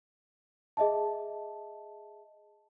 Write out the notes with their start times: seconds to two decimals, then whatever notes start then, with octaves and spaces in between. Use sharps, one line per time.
0.77 G#4 D#5 E5 A5